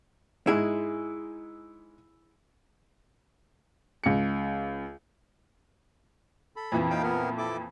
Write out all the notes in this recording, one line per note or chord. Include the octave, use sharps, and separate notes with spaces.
G#2 G#3 E4 G#4
C#2 C#7
A4 B5
F2 A#2 E3
D#4 F5 G5
B3 A#4
E4 A4 D6